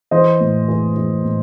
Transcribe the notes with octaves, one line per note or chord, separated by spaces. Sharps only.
E3 C5 D#5
A2
E3
E3
A2